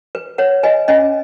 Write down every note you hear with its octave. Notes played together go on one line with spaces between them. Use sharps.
B4
B4 C#5 F#5
B4 D#5 G#5
C#4 D#5 G#5